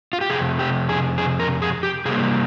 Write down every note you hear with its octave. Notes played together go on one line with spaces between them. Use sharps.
F4
G4
F2 C3 G#4
G4
G#4
G#4
A#4
G#4
G4
C3 G3 A#3 G#4